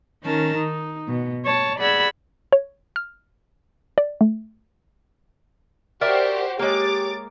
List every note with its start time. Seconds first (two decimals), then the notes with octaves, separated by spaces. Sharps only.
0.24 D#3 C#4 A#4 A5
0.58 D#4
1.08 B2
1.46 C#5 A5
1.79 G#4 D5 F#5 B5 E6 G#6
2.52 C#5
2.96 F6
3.98 D5
4.21 A3
6.01 F#4 G4 A#4 C5 D5 E5
6.59 G#3 A#3 G4 C#5 D6 A6